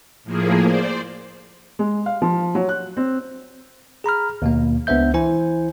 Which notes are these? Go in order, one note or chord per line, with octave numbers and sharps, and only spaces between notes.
A2 F3 A#3 G#4
C5 D5
G#3
F5
F3
F#3
F#6
C4
G#4 A#5 B5 F6
D#2 B2 A#3
C#2 B3 D4 C5 E5 G6
E3 E4 C5 G#5